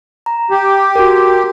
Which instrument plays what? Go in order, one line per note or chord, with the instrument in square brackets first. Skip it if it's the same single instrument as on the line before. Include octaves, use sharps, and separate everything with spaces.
[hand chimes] A#5
[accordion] G4
[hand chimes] F#4 A#4